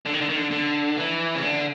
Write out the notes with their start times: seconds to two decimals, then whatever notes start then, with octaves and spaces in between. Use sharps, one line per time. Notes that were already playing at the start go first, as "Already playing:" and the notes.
0.06 D3
0.13 D#3
0.21 D3
0.29 D#3
0.37 D3
0.51 D3
0.97 E3
1.35 C#3
1.42 D3